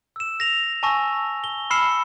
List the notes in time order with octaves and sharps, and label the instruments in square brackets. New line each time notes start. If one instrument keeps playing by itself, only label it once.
[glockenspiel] E6 E7
A#6 F7
G#5 A5 C#6 E6 A#6
G7
B5 E6 F6 C7 C#7 E7